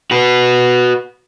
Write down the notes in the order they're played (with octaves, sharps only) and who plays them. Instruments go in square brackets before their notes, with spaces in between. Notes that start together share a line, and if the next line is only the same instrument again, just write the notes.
[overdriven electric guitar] F#4 B4